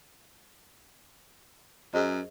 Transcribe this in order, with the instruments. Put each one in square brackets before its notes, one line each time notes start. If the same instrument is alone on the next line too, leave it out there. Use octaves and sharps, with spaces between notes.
[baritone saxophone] F#2 [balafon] G#4 C5 D#5